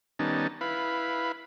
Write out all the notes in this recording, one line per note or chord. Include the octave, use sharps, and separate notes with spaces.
D#3 G3 B3 C#4 D#4 A5
E4 B4 F5 B5